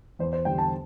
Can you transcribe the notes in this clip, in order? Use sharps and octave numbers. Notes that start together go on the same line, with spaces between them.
E2 C5
C5
D3 G3 G5
A5